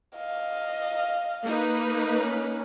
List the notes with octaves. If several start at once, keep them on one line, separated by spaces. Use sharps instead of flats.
D#5 F5
A#3 D#4 B4
C#4